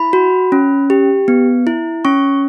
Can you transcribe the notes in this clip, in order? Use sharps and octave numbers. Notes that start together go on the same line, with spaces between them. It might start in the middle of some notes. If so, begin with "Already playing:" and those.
Already playing: E4 B5
F#4
C#4
G4
B3
E4
C#4 C#6